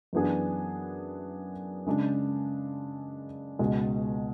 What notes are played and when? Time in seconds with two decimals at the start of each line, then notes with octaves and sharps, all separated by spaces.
0.13 F#2 E3 B3 D4 G#4
1.86 C#3 G#3 D4
3.59 C#2 B2 G#3